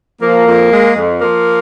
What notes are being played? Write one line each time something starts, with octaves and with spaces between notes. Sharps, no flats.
F3 A#3
F2
G#3
F2
F3 A#3